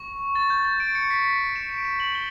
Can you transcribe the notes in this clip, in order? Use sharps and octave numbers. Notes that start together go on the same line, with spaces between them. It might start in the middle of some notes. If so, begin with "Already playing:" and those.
Already playing: C#6
A6
G6
A6
D7
C#7
B6
E7
D7
E7
F#7
G7